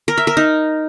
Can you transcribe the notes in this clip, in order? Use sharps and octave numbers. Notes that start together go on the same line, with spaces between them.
A#4
E5
A#4
D#4